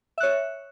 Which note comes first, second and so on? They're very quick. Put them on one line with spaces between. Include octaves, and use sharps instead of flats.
E5 F#6 C#5